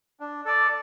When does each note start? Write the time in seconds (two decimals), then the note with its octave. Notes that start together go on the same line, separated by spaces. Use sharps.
0.20 D4
0.45 A4 D5